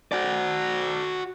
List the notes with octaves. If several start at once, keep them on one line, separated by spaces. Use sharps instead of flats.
F#4 D5